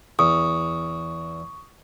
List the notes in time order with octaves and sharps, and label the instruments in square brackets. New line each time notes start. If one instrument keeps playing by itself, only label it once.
[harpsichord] E2 [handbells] C#6 [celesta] D#6